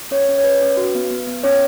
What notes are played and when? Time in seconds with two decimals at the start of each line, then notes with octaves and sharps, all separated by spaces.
0.11 C#4 C#5
0.29 C#4
0.38 C#5
0.44 C#4 B4
0.62 C#4
0.77 F#4
0.95 B3
1.11 B3
1.27 B3
1.43 C#4 C#5